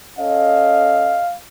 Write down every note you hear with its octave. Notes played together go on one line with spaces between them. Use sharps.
C#4 A4 D#5 F5